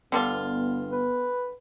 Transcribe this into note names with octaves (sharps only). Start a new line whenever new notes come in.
G1 D3 G3 B3 F4
B4